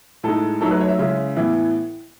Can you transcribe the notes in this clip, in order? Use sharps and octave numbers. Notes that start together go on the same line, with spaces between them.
A2 G#3 D#4 A4
F#3 A3 D#4 A4
B4
C#5
E5
C#3 G#3 C#4 E4
A2 E3 B3 E4